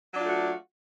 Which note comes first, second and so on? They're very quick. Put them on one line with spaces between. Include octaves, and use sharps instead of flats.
F#3 D4 F4 A3 F#4